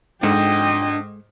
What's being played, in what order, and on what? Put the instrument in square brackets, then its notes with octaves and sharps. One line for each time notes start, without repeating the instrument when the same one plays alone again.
[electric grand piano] G#2 [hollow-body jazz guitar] G#3 A4 F#5 [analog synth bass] D4 [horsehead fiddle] D#5 G5